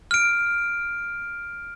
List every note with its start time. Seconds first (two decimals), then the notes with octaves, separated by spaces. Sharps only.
0.11 F6 D7